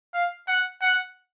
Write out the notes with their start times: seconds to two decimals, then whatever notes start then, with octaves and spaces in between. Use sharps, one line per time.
0.14 F5
0.48 F#5
0.82 F#5